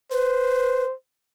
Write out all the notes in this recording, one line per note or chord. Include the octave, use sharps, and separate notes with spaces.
B4 C5